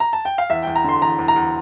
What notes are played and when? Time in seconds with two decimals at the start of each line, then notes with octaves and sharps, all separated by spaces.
0.00 A#5
0.13 A5
0.25 G5
0.38 F5
0.50 E2 E5
0.63 E2 G5
0.75 A#5
0.84 D3 C6
1.02 E2 A#5
1.19 E2
1.28 A#5
1.36 E2